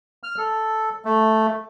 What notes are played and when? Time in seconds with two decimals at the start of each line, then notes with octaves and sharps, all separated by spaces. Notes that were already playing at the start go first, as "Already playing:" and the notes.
0.23 F6
0.38 A4
1.05 A3